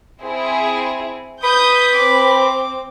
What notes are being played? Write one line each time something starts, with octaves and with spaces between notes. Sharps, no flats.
C4 E4 G#4
B4 D#6 G6
C4 D6